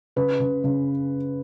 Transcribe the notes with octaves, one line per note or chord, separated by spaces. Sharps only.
C#3 B4
C#3
C#3